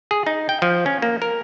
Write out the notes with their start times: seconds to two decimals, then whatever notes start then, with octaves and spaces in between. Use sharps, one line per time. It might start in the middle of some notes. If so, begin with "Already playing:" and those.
0.11 G#4
0.26 D#4
0.49 G5
0.62 F3
0.86 C#4
1.02 A#3
1.22 A#4